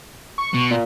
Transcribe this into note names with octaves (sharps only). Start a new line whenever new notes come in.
C#6
B2
A#2